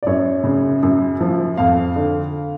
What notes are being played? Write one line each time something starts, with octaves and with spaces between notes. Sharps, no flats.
D5
F#2 C#5
C#3
F#2
F3
F2 F5
D3